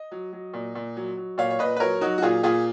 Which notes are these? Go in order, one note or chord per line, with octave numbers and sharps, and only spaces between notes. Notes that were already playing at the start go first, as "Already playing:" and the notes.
Already playing: D#5
F#3
F#3
A#2
A#2
F#3
F#3
A#2 C#5 F5
C#5
A#2 B4 D#5
B4
F#3 A#4 C#5
F#3 D#4 F#4
F#4
A#2 F4 G#4
A#2 F4 G#4